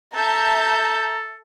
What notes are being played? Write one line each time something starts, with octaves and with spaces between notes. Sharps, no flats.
A4 E5 A5 A#5 G6